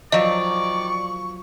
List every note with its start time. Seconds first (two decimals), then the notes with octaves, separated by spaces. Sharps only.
0.12 D#3 F3 F#3 D5 D#5 C#6